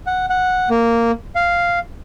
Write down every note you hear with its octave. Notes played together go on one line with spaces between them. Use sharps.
F#5
F#5
A#3
F5